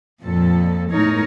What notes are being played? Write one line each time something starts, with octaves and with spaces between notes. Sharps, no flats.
F2 A#2 F3 A4
E2 A2 G#3 D#4 A#4 C#5